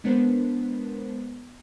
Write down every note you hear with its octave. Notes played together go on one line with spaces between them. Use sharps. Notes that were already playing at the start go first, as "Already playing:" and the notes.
G#3 B3 D4 A#4 C5